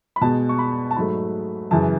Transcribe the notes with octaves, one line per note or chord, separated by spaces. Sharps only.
B5
B2 G#3 A5
C#6
B5
A5
G#2 F#3 A3 B5
F#2 C#3 E3 A5